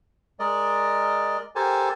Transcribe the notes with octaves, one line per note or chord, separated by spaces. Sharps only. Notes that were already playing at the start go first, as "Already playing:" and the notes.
G#3 A#4 D5 D#5
G4 A4 A#4 C5 G#5 A5